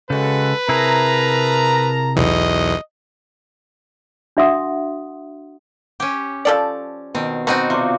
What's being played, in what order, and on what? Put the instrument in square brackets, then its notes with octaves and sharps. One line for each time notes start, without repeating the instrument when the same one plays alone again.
[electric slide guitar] C#3 [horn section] G#3 F#4 A4 [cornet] B4
[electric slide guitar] C3 E4 G#4 [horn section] A#4 A5 A#5
[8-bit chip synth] B1 E2 [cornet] D#5
[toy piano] D4 F#4 E5 F#5 C6 D#6
[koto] C#4 G4
[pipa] F3 A4 D5
[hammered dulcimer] B2 [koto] D#3 C4
[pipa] B2 [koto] C4 D#4 F#4 [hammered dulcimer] B5
[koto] C3 [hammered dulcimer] F4 D5